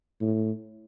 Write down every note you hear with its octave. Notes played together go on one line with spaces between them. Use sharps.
A2